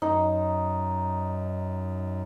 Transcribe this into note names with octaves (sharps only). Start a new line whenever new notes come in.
F#2 D#4